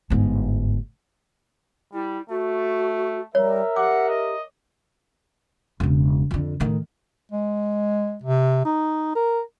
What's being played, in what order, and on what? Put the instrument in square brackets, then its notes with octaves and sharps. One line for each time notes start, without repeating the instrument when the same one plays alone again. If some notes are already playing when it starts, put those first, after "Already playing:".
[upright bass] G1 G#2
[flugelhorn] G3 [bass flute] E4
[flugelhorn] A3 [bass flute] F#4
[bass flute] G3 [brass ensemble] A#4 E5 [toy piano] C#5
[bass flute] G4 [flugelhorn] F#5 [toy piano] D6
[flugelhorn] D#5
[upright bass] E1 C#3
F2 D3
A2 D#3
[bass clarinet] G#3
C3
D#4
A#4